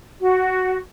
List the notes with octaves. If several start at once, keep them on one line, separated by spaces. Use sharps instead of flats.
F#4